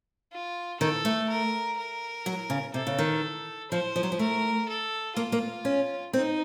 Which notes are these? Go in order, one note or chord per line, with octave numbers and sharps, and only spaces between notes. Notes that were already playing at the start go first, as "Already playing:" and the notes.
F4
D#3 A4
A3
A#4
A#4
F#3
C#3
C3 A4
C#3
D#3
F3 C5
F3
F#3
F3
A3 A#4
A4
A#3 F4
A#3
C#4
C4 D#4